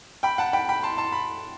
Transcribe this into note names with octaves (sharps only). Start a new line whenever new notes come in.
G5 B5
F#5 A5
G5 B5
G5 B5
A5 C6
A5 C6
B5